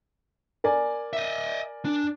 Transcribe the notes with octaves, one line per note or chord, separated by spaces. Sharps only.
A#4 D5 G#5
D#5 E5
D4